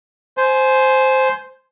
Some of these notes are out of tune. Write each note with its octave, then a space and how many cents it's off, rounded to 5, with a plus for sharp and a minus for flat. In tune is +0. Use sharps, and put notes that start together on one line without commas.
C5 +0 G#5 +25